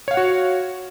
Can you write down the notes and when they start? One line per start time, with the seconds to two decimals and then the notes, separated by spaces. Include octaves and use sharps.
0.08 C#5
0.11 F5
0.14 F#5
0.17 F#4